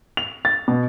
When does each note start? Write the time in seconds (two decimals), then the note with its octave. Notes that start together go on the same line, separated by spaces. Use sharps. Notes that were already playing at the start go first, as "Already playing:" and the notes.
0.17 F7
0.45 A6
0.68 B2